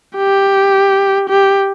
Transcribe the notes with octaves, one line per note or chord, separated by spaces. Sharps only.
G4
G4